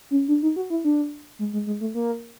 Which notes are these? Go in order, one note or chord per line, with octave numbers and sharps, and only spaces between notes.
C#4
D4
D#4
F#4
E4
D4
G#3
G#3
G#3
A3
A#3